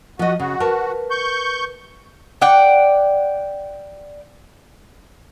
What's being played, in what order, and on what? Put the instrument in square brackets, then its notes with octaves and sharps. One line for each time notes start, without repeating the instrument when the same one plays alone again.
[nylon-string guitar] F3 D#5 [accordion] F#4
[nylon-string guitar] C#3 [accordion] F#4
[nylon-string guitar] A#4 B4 A5
[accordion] C#6 G6
[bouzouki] D5 F#5 G5